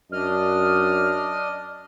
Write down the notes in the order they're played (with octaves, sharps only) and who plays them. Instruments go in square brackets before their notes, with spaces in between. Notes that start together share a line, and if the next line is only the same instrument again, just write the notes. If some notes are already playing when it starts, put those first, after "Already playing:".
[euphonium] F#2 [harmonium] D4 D#5 [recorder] F6